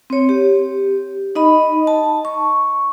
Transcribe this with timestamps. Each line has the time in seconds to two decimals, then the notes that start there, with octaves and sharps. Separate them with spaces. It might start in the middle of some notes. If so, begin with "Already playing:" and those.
0.10 C4 C#5
0.29 G4
1.35 D#4 D#5 B5
1.87 A5
2.25 C#6